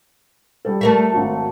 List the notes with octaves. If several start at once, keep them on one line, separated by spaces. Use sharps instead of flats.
G3 A4
A3 A#4 E5
G#1 F#3